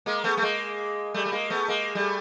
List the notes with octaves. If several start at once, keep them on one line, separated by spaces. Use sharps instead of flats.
G#3 A#3
A3 B3
A3
G#3 A#3
G3 A3
A3
G#3 A#3
A3 B3
G#3 A#3
G3 A3